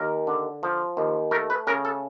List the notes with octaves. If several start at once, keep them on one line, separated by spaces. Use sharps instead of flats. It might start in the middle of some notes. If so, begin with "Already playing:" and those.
Already playing: D#2 A#4
D3
F3
D#2
A3 A#4
B4
C#3 A#4
A4